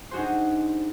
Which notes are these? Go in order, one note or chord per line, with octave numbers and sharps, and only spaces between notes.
D4 D#4 F#4 G#4 C5